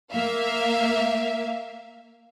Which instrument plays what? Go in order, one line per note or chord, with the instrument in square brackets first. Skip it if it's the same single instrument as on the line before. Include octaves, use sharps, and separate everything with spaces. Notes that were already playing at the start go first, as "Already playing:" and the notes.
[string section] A#3 E5 F5